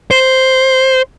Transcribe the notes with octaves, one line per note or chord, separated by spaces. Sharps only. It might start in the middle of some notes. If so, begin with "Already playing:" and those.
C5